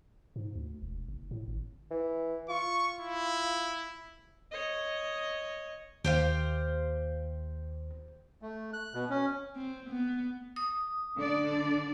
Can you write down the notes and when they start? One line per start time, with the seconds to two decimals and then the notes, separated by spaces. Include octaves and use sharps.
0.36 G#2
0.55 D2
0.82 E1
1.08 F#1
1.31 A2
1.48 G#1
1.91 E3
2.49 F4 C#6
3.00 E4
4.51 C#5 D#5
6.05 D#2 G4 C5 F5
8.42 A3
8.73 F#6
8.94 B2
9.10 C#4
9.56 C4
9.89 B3
10.56 D#6
11.15 D3 D4 D5